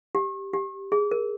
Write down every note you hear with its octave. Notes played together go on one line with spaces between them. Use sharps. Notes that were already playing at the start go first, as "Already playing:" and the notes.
G4
G4
G#4
A#4